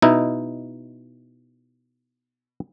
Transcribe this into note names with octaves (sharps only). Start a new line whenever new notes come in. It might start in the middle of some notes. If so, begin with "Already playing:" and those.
B2 D#4 E4